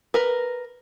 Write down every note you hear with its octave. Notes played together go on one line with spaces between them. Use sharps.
A#4 B4